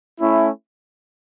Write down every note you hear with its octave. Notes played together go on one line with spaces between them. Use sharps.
A3 C#4 E4